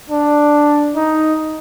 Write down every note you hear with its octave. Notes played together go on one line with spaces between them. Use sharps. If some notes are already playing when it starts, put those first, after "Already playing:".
D4
D#4